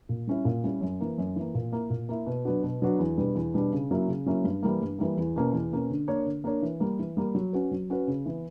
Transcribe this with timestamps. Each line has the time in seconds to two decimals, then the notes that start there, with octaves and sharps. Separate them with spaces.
0.09 A#2
0.27 G3 C#4 E4
0.45 A#2
0.64 G3 C#4 E4
0.81 F#2
1.01 E3 A#3
1.18 F#2
1.36 E3 A#3
1.54 A#2
1.72 A#3 E4
1.90 A#2
2.09 A#3 E4
2.26 B2
2.45 F#3 B3 D4 F#4
2.63 B2
2.82 F#3 B3 D4 F#4
2.99 E2
3.17 B2 G3 B3 D4
3.35 E2
3.54 B2 G3 B3 D4
3.72 C#3
3.91 F#3 A#3 C#4 E4
4.08 C#3
4.26 F#3 A#3 C#4 E4
4.44 G2
4.63 E3 G3 A#3
4.81 G2
4.99 E3 G3 A#3
5.17 E2
5.36 B2 A#3 C#4
5.53 E2
5.71 B2 A#3 C#4
5.90 D3
6.08 A#3 D4 A#4 C#5
6.26 D3
6.44 A#3 D4 A#4 C#5
6.62 E3
6.80 G3 A#3
6.99 E3
7.17 G3 A#3
7.35 F#3
7.53 C#4 F#4 B4
7.71 F#3
7.90 C#4 F#4 B4
8.07 C#3
8.26 E3 B3